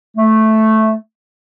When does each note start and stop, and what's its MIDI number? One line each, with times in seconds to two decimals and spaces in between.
0.17 0.94 57